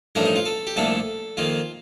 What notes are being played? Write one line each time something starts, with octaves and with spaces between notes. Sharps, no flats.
A1 G2 F3 A3 D4 A#4
D#4
F4
A4
G4
C2 A#2 F3 A3 D4 A4
F2 D#3 A#3 F4